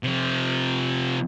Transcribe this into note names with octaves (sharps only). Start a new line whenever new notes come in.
C3 F3